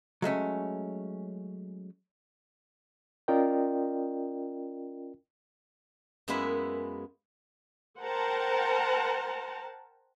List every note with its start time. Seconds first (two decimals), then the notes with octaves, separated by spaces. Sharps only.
0.22 F#3 G#3 A3 C#4
3.28 C#4 F4 A#4 D5 D#5 G5
6.28 F#2 G#3 A#3 B3 E4 E5
7.99 A#4 C5 F#5 G5 A5 A#5